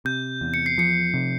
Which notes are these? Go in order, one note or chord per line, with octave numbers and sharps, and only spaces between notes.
C3 G6
E2
C#7
C7
F3 C#7
C3